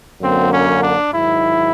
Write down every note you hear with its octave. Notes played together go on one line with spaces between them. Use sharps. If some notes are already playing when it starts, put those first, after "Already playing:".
F#2 D3 F#3 A#3 C4
C#4
D4
G#2 D#3 F#3 E4